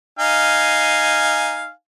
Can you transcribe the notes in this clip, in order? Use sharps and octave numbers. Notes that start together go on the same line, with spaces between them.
D#4 F5 G#5